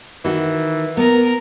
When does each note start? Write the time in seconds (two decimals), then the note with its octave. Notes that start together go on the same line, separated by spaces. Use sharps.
0.25 D#3 E3 F#4
0.97 B3 A#4